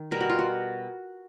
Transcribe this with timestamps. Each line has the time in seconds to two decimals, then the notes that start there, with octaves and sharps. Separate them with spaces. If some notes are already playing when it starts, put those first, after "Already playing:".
Already playing: D#3
0.11 B2 G3 B3 A#4
0.21 F#4
0.29 F4
0.39 F#4